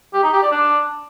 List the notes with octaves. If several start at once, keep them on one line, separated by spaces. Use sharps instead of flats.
G4
D#4
G4
D5
D4